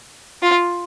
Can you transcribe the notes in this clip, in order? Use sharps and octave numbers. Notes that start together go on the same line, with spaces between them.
F4